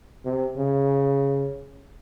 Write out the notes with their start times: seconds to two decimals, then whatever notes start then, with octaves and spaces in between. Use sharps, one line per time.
0.25 C3
0.57 C#3